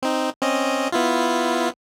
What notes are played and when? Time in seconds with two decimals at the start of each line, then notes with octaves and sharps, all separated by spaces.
0.03 C4 D#4
0.41 C4 C#4 D#5
0.92 B3 E4 F4